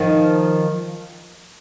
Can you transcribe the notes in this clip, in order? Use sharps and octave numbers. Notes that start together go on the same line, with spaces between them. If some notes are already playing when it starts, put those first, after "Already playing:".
Already playing: D#3 F3